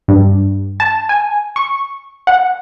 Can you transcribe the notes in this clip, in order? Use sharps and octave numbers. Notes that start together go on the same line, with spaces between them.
G2
A5
G#5
C#6
F#5